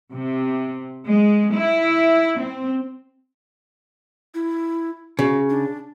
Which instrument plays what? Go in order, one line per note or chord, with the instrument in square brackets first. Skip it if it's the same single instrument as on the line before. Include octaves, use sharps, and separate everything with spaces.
[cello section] C3
G#3
E4
C4
[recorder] E4
[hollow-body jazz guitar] C#3 [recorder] F#4
[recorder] D4